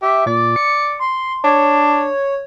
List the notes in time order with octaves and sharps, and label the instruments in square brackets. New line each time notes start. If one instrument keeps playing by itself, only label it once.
[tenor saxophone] G4 [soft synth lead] E5
[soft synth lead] A#2 [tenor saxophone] D5
[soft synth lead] C#7
C6
[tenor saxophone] D4 [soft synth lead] C#5